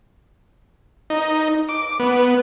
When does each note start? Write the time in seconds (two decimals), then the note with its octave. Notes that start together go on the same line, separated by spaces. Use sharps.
1.10 D#4
1.69 D6
2.00 B3